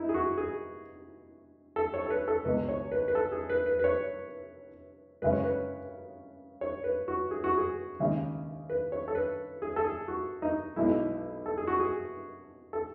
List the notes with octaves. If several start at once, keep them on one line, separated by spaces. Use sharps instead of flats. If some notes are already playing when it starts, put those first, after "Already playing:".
Already playing: D#4 E4
G#4
F#4
G#4
A4
C#5
A4
B4
A4
C#2 B2 G#3 B4
C#5
B4
B4
A4
G#4
B4
B4
B4
C#5
F#2 C#3 G#3 B4
C#5
B4
C#5
B4
F#4
G#4
F#4
G#4
D#2 C#3 G#3
B4
C#5
A4
B4
G#4
A4
G#4
F#4
D#4
B1 B2 G#3 E4
A4
G#4
F#4
G#4
A4